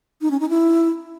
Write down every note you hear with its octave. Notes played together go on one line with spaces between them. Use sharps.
D#4
C#4
D#4
E4